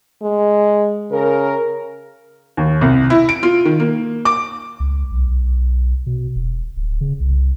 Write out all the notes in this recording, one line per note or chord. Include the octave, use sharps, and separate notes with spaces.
G#3
C#3 A#4
D#2
C2
E4
D7
F4
D#3
A#3
D6
C#2
B1
B2
E1
D1
C#3
C2